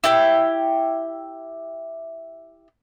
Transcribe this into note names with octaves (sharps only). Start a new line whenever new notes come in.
E4 G4 G5